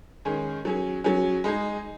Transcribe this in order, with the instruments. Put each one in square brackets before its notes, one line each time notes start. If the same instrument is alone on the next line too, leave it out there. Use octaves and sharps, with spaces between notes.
[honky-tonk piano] D#3 G#3 C#4 G#4
F#3 C#4 G#4
F#3 C#4 G#4
G#3 D#4 G#4